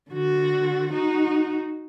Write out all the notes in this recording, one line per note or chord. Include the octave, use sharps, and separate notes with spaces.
D3 F#4
D#4 F#4